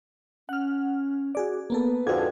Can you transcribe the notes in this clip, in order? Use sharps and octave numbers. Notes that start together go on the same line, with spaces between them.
C#4 F#5 F6
F#4 G#4 D5
A#3 B3 A4 B4
F2 G#2 D3 F#4 G#6